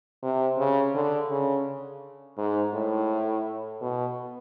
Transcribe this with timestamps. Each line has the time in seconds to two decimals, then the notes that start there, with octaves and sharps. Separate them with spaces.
0.23 C3
0.58 C#3
0.94 D3
1.30 C#3
2.38 G#2
2.74 A2
3.81 B2